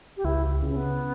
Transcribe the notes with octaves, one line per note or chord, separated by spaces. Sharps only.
G4
C#2 E4
C#3
C#4
B3